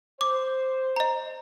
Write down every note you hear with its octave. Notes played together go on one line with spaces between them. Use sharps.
C5 D6
D#5 A#5